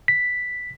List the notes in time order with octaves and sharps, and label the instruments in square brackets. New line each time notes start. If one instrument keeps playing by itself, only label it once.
[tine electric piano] B6